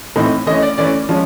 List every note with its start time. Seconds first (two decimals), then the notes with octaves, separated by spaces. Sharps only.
0.16 A2 E3 A3 C4 D#4
0.46 E3 A3 C#4 D#5
0.63 D5
0.78 E3 A3 C#4 D5
1.09 F3 G#3 C#4